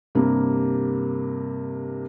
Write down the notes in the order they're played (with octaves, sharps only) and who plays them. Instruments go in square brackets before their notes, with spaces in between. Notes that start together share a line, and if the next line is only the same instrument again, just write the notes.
[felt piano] G2 C3 A#3